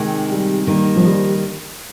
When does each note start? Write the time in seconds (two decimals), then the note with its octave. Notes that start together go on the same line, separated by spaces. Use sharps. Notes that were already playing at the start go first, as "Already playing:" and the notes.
Already playing: C3 D#3 G#3
0.30 G3
0.67 D#3 G3 A#3 D#4
0.96 F3
1.05 G3